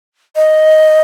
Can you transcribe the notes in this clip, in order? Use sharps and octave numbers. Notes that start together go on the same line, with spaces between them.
D#5